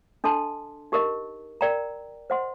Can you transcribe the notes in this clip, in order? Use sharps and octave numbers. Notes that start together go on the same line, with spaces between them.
D4 A4 D#5 A5 C6
D#4 G4 A#4 D#5
A#4 D5 G5 A#5
C5 D#5 F#5 C6